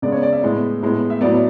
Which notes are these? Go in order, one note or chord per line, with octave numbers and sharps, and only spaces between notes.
C#3 G#3 B3 D5
C#5
D5
E5
A2 G#3 B3
A2 G#3 B3
E5
A2 F#3 B3 D5